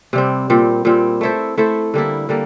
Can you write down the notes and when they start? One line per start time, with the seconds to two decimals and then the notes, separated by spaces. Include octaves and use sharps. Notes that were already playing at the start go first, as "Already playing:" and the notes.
0.13 C3 G3 C4
0.50 A#2 G3 C4
0.85 A#2 G3 C4
1.21 A3 E4 A4 C5
1.57 A3 E4 A4 C5
1.94 D3 G3 A#3 E4
2.29 D3 G3 A#3